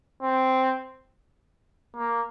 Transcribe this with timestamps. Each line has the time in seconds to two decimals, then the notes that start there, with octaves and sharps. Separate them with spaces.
0.22 C4
1.96 A#3